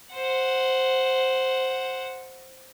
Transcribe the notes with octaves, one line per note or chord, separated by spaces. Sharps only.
C5 F#5